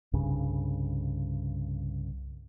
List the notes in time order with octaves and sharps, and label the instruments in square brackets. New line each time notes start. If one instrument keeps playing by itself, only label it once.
[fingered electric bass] C2 G2 C#3